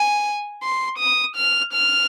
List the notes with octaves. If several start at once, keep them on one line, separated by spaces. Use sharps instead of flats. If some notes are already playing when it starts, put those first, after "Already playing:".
Already playing: G#5
C6
D#6
F6
F6